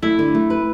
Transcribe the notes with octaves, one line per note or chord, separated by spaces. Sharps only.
A3 E4
D3
A3
B4